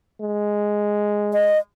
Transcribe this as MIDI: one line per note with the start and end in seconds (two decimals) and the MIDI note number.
0.21 1.57 56
1.33 1.58 75